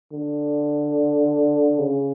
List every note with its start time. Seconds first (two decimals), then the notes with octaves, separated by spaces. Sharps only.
0.12 D3
1.79 C#3